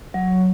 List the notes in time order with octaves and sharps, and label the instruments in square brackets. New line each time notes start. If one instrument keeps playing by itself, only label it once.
[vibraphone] F#3